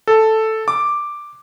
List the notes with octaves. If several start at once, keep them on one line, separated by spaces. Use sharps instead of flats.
A4
D6